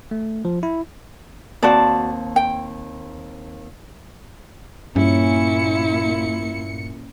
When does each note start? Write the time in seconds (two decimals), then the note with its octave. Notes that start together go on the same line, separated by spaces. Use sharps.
0.11 A3
0.45 F3
0.63 E4
1.63 D#2 C4 F#4 D5 A5
2.36 G5
4.96 G2 A#2 C#4 E4 C#7